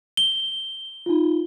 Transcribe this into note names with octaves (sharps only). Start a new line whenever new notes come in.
G7
D#4 F4